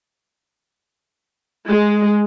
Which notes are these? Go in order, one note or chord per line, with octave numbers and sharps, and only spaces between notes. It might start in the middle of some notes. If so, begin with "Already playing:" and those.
G#3